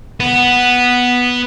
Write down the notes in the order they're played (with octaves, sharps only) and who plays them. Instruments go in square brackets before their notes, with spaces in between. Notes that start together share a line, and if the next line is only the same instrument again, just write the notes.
[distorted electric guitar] B3